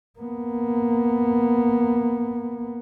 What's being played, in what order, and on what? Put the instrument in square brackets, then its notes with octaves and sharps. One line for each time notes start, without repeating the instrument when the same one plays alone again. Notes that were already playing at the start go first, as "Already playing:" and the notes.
[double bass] A#3 B3